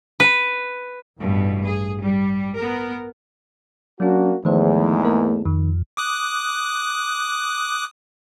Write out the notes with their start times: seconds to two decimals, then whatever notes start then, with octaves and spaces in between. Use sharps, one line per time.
0.20 B4
1.18 A1 G2 B2
1.64 G#4
2.02 G3
2.56 B3 A#4
4.00 F#3 A#3 C#4 D4 F#4
4.45 E2 G#2 D#3 F3 A3 C5
5.03 A#3 A#4
5.45 F2 D#3
5.97 D6 D#6 F#6